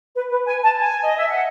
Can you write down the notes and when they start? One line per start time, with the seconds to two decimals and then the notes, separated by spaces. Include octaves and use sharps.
0.15 B4
0.31 B4
0.47 G#5
0.63 A5
0.79 G#5
1.05 D#5
1.17 E5
1.29 F#5